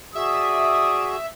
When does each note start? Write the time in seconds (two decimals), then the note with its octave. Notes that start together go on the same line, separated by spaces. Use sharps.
0.15 F#4 G#4 D5 E5 D#6